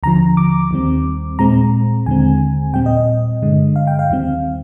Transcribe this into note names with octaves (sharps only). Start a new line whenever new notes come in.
D#2 D3 F3 A#5
D6
D#2 D#3 G3 C4
A#2 G#3 C4 A#5
D#2 D3 G#3 C4 G#5
A#2 G3 C4 G5
D#5
D#5
G2 D3 G#3
F5
G5
F5
D#2 D#3 G3 C4